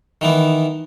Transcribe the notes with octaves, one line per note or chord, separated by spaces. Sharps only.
D#3 E3 B3